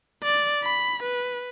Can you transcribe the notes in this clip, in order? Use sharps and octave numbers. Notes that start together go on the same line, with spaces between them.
D5
B5
B4